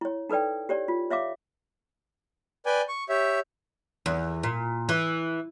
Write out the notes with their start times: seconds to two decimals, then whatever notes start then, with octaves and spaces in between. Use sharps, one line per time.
0.01 E4 C#5
0.30 D#4 A4 B4 D5 G5
0.69 G4 C#5 D5
0.88 F4
1.10 C#5 E5 F5 D6
2.66 B4 D5 G5 G#5
2.88 C#6
3.09 G4 C#5 E5
4.06 E2
4.43 A#2
4.89 E3